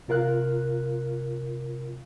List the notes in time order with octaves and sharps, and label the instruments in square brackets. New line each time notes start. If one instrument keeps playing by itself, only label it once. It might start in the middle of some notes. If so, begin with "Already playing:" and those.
[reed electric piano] C3 F4 A#4 F5 F#6